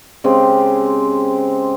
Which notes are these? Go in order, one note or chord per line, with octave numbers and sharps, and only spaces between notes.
C#3 G#3 C4 G4